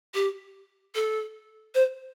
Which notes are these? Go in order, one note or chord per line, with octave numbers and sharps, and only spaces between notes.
G4
A4
C5